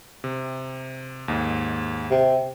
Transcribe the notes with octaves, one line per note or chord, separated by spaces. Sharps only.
C3
D#2 G#2
C3